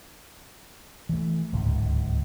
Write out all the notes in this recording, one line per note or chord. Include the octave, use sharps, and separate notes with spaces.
E3 A3
D1 C#2 G#2